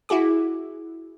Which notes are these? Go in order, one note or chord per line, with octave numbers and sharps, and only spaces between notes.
E4 F#4 G#4 D6